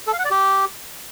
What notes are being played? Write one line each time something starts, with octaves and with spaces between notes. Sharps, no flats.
A4
F5
F#5
D5
G4